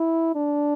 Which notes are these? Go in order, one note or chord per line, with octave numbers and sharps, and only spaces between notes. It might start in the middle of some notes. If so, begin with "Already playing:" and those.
Already playing: E4
D4